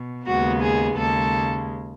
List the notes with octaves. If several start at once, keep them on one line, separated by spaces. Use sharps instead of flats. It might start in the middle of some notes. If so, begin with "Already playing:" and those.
Already playing: B2
D#2 C#3 G#3 B3 F#4
G#4
D#2 C#3 G#3 A4